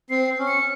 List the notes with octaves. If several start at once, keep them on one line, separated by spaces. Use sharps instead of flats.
C4 C7
C#4
C#7